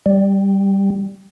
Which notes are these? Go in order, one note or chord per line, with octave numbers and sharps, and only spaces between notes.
G3